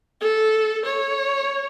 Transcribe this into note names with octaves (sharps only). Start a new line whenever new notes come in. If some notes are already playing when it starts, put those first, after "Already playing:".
A4
C#5